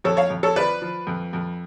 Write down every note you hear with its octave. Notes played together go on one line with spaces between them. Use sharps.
F2 A4 C#5
C#5 F5
F2
A4 C#5
F3 B4 D5
F3
F2
F2